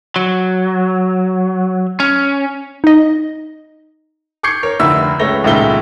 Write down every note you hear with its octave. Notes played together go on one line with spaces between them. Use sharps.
F#3
C#4
D#4 D#5
C#6 D6 G6 G#6 C7 C#7
A#4 C#5
F1 D2 E5 E6
C#2 A3 B4 C#5 A#6 G7
G#1 C#2 A#2 A3 E5 G7